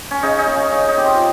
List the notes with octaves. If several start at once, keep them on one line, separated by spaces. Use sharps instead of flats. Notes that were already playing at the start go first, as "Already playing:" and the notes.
C#4
C#3 D#4
D#4
C#3
C#4
C#3 D#4
D#4
C4 G4
F4